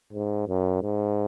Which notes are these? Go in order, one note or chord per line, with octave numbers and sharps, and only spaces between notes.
G#2
F#2
G#2